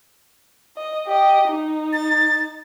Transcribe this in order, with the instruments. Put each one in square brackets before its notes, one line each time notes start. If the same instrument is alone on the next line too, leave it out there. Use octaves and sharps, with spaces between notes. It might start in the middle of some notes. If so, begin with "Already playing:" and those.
[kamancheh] D#5
G4 D#5
D#4
[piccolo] A6